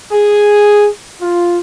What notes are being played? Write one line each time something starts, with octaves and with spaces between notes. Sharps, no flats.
G#4
F4